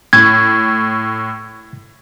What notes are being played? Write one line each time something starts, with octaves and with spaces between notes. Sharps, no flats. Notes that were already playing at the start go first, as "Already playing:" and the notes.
A2 G#6